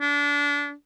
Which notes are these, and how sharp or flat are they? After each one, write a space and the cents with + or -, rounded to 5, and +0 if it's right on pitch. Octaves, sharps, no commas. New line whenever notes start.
D4 -30